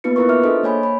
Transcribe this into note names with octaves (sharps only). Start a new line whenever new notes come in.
A#3 B3 D#4 F4 B4 C#7
D#4 E4 A#4 B4 C#6
F4 E5 D6 F6
D4 G#4 A4 C5 D#5
A#3 C#5 G#5 B5
B5